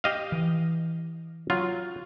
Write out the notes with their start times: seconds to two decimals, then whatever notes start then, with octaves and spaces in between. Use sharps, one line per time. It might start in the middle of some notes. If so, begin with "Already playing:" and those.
0.04 G4 D#5 F5
0.32 E3
1.50 F#3 F4